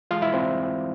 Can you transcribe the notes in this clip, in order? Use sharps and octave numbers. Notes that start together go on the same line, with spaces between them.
E3 G#3 F4 F5
E4 E5
C4 C5